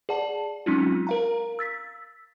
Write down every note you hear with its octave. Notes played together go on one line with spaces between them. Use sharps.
G#4 D5 F#5 A5
F#3 G#3 C4 C#4 D#4 F4
A#4 F5 A#5
E6 A6 B6